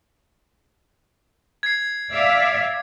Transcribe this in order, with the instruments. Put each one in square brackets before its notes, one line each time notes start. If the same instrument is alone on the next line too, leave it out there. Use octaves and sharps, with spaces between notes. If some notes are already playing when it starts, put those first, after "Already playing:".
[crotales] G#6 C7
[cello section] D5 E5 F5